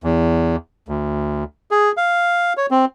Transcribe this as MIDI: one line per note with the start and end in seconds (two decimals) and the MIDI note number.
0.04 0.56 40
0.88 1.44 38
1.71 1.92 68
1.97 2.53 77
2.57 2.66 73
2.71 2.85 60